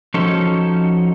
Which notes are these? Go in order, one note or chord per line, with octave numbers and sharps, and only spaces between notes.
F3 C#4 D#4 F#4 A4